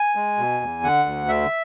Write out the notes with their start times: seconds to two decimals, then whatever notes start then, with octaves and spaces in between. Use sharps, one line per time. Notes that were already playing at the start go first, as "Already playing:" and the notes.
Already playing: G#5
0.16 G#3
0.38 B2
0.61 E2
0.83 D3 F#5
1.06 D2
1.29 D3 E5